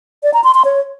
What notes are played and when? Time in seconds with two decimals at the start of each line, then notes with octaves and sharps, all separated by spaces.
0.23 D5
0.34 A#5
0.44 C6
0.54 C6
0.65 C#5